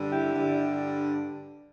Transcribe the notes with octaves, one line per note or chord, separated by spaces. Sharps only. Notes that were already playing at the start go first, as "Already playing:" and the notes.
Already playing: G2 D3 G3
E4 G4
G2 D3 G3